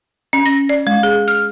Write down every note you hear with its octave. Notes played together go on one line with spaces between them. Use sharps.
C#4
A#6
D5
G#3
G#4
F6